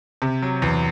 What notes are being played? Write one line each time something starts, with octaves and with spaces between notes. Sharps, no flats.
C3
F#3
E2